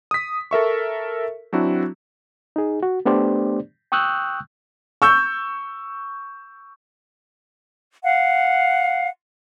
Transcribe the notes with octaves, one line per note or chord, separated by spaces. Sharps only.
D#6 B6
A4 A#4 E5 C#6
F#3 C4 D4 E4 F#4
D#4 G#4
F#4
A3 B3 D4 G4 C5 D5
G5 C#6 D#6 E6 F#6 G6
C#6 E6 G6
F5 F#5